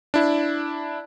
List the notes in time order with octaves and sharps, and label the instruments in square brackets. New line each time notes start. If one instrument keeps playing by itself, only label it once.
[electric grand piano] D4 E4